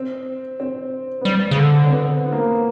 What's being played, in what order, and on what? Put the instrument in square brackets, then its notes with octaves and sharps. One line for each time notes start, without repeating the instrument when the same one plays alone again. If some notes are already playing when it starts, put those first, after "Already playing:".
Already playing: [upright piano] C4
C4
B3
[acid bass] G3 [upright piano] C4
[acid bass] C#3
D3
[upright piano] C4
B3
B3
A#3
B3